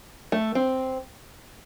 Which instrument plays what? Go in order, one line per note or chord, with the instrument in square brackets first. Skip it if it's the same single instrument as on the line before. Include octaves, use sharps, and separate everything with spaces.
[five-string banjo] A3
C4